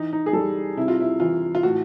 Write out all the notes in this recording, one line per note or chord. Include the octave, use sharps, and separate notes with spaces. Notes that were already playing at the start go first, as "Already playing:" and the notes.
Already playing: E3 D#4
D#4
G#4
G3 A4
C3 E4
F4
E4
E3 F4
F4
A2 F#4